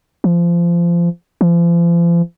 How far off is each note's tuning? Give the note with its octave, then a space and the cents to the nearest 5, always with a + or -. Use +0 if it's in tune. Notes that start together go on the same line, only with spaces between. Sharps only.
F3 -25
F3 -40